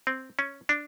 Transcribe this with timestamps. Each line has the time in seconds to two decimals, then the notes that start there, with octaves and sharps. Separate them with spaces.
0.07 C4
0.39 C#4
0.69 D4